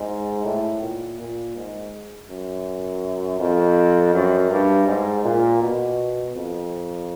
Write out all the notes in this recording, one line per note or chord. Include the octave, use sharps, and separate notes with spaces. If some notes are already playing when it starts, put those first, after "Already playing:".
Already playing: G#2
A2
A#2
A#2
G#2
F#2
F2
F#2
G2
G#2
A#2
B2
F2